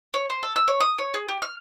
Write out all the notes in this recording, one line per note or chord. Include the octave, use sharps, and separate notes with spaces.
C#5
C5
A4
E6
C#5
D#6
C#5
G#4
G4
F6